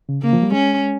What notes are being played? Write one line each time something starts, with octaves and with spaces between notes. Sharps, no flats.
C#3
C#3 A#3
F3
G3
G#3 C#4